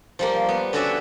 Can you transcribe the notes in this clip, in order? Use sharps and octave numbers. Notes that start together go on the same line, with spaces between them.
F3 G3 A#3
B3
D3 C#4 F#4 D5 E5